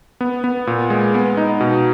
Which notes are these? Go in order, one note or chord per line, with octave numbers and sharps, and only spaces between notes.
B3
B3
A#2
G#3
B3
D#4
B2